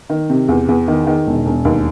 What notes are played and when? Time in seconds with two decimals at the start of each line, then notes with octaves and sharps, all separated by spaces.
0.09 D#3
0.30 C3
0.48 E2
0.68 E2
0.88 D#3
1.07 D#3
1.26 E1
1.46 E1
1.65 D#2